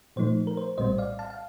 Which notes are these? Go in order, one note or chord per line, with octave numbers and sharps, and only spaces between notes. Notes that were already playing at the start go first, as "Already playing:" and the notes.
A#2 F3 A3 D#4 C5
A#4
C5
A#1 A2 G3 C4 C5 D#5
D5 F5
F5 A5
F5